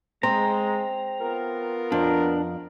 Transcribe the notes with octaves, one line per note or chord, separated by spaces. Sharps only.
G#3 C4 A#5
B3 F4 A#4
F2 D4